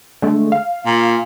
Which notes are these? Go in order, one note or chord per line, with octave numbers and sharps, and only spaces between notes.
D3 G#3 A3
F5
A#2